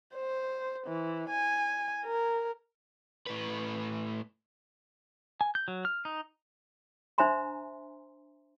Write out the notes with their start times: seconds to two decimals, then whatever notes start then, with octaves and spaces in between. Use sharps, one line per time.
0.15 C5
0.87 E3
1.30 G#5
2.05 A#4
3.26 A2 B4
5.41 G#5
5.55 G6
5.68 F#3
5.85 F6
6.05 D#4
7.18 D4 C5 E5 G#5 A#5 C6